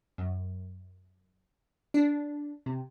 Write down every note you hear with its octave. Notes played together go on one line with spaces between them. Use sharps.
F#2
D4
C3